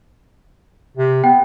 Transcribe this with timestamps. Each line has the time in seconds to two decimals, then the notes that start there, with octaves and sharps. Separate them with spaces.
0.97 C3
1.24 B3 G5